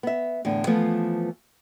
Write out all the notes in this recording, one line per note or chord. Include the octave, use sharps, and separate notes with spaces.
B3 E5
E2 A2 D3
E3 F3 A3 B3 F4